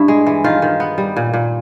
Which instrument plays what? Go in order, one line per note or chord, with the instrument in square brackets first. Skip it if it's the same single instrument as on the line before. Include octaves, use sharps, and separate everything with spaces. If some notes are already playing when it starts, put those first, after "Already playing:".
Already playing: [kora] G2 E4
G#3
E3
D#3 F4
D#3
B3
G3
A#2
A#2